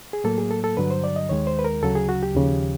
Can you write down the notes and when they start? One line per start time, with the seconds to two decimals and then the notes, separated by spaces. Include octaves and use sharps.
0.13 G#4
0.24 A2 F#3 A#3 A4
0.38 G#4
0.51 A4
0.64 A4
0.77 G2 D3 F#3 B4
0.91 C5
1.04 D5
1.16 D#5
1.29 D#2 D#3 G#3 C#5
1.47 C5
1.59 B4
1.64 A#4
1.83 D2 C#3 F#3 A4
1.95 G#4
2.09 F#4
2.23 G4
2.35 D#2 C#3 F3